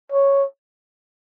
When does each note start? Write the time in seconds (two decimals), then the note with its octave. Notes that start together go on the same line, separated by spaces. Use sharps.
0.12 C#5